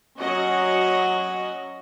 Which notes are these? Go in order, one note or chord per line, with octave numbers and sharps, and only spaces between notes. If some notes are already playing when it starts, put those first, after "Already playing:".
F#3 C#4 F#4 D#5